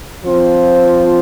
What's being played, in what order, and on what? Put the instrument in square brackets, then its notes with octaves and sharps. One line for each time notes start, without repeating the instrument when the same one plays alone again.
[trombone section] F3 C4 F4 C5